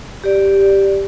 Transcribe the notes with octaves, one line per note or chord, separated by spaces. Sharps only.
G4 D5